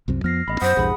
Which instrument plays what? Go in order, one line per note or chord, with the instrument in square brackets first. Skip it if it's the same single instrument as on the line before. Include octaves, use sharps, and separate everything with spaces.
[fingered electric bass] C2 F#2 C3
[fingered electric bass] F2 F3 B3 [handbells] F6 A#6 C7
[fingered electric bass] A1 [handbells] B3 D#5 B5
[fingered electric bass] F#2 [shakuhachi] C5 [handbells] F#5 D#6 B6
[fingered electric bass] A#1 E2 G2 [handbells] G#4 B5